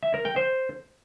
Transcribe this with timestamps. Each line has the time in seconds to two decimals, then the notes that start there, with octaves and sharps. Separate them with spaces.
0.03 E5
0.14 A#4
0.25 G5
0.36 C5